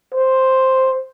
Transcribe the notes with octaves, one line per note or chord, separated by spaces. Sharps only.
C5